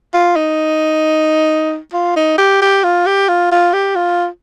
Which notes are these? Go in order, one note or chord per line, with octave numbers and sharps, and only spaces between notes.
F4
D#4
F4
D#4
G4
G4
F4
G4
F4
F4
G4
F4